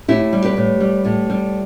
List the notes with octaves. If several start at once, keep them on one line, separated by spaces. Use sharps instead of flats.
A2 E4 G4
G3
G4 B4
A2
G3
A2
G3